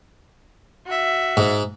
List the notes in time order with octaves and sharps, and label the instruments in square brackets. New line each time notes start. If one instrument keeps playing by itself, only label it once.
[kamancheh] F#4 E5
[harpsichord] G#2